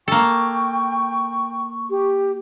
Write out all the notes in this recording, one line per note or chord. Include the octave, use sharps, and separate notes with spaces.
A#3 A4 G5 C#6
G4